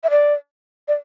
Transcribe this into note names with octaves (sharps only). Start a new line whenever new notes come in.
E5
D5
D5